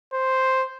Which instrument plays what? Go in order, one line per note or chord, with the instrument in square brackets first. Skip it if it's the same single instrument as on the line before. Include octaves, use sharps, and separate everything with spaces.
[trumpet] C5